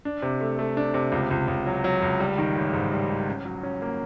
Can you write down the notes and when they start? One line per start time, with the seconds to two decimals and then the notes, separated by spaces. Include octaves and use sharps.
0.05 D4
0.22 C3
0.41 A3
0.59 A3
0.77 D4
0.94 C3
1.12 C#2
1.31 C#2
1.48 C#2
1.66 F#3
1.84 F#3
2.02 C#2
2.20 G3
2.38 D#3
2.56 A1
2.73 G#2
2.92 G3
3.10 D#3
3.28 C#4
3.45 F#3
3.63 C#4
3.82 A#3